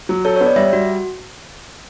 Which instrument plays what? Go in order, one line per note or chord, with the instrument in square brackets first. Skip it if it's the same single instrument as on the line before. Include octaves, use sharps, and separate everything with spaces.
[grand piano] F#3
[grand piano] A4 [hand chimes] C#5
[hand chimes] C#5
[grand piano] B3
[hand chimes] D5
[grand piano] G3 [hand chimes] E5
[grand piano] G3 [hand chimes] F#4